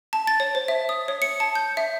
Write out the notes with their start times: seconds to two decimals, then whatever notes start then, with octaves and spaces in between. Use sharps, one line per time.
0.13 A5
0.27 A6
0.40 C#5
0.55 C5
0.68 E5
0.89 D#6
1.08 C#5
1.22 C#7
1.40 A5
1.55 G6
1.77 E5